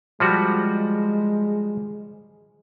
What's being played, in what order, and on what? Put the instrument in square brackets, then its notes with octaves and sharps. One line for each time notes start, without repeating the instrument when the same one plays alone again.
[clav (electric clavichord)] F3 G3 F#4 [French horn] G#3